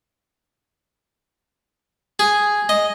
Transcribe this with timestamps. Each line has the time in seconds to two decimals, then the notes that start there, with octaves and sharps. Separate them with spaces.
2.19 G#4
2.69 D#5